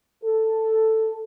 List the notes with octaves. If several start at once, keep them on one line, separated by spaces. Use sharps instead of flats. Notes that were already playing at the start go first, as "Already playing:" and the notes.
A4